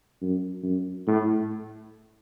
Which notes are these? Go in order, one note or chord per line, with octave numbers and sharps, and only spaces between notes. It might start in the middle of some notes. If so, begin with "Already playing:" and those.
F#2
F#2
A2